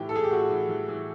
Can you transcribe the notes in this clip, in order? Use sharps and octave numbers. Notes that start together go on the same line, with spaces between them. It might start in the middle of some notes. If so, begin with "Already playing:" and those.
Already playing: A2 E3 G4
A4
A2 G#4
G4
A2 F#4
E3
E3
E3